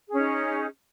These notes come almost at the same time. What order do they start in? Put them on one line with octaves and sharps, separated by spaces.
G#4 C#4 D#4